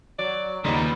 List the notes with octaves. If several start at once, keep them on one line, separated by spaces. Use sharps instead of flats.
F#3 D5
D#2 A#2 C#3 G3 B3 D#4